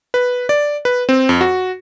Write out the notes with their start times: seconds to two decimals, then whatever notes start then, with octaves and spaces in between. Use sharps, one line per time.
0.14 B4
0.49 D5
0.85 B4
1.09 C4
1.29 F2
1.41 F#4